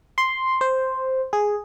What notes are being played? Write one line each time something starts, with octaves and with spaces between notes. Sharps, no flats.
C6
C5
G#4